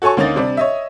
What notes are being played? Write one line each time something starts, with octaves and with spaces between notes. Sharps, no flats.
F#4 A4 C#5 G#5 C#6
D2 A#3 C#4 D#4 A6
C3 G3 D4
C#5 D#5 E5